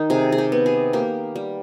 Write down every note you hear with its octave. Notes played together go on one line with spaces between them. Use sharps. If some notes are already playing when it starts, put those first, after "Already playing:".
Already playing: D#3 D#4
C3 G#4
G#4
G4
B3
G#4
A#3 G4
G3